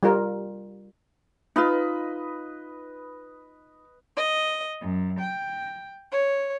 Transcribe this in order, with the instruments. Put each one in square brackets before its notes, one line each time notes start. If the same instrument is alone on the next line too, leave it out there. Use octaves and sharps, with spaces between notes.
[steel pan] G3 F4 A#4
[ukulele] D#4 F4 [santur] B4 D#5 B5
[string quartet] D#5
F#2
G5
C#5